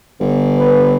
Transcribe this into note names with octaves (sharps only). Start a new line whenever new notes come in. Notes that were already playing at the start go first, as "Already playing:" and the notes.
G1
B4